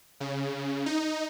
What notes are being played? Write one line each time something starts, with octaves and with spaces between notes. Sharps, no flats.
C#3
D#4